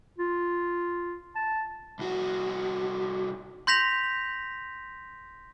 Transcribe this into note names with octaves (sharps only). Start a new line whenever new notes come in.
F4
A5
C2 F#4
C6 G6 A#6 B6 F7